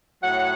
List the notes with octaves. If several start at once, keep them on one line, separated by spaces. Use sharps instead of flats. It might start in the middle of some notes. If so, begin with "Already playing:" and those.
A2 F#3 F#5